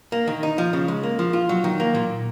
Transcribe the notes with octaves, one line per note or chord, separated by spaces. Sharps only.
A#3
D#3
D#4
F3
C#3
G#3
A#3
F3
F4
F#3
D#3
A#3
A#2